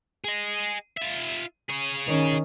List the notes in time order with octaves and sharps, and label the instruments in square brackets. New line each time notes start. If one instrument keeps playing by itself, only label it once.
[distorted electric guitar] G#4 D#5
F4 E5
G#4 C#5
[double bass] D#3 C#4